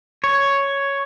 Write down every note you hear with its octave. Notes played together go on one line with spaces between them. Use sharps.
C#5